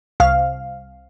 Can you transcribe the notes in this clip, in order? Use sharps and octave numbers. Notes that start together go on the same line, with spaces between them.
C2 F5